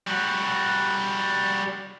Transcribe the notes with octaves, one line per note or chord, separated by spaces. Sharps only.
G3 F#4